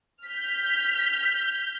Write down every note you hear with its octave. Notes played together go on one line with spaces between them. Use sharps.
F6 G6 B6